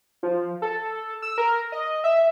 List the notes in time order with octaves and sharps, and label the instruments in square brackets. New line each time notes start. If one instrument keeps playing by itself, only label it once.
[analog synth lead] F3
A4
E6
A#4
D#5
E5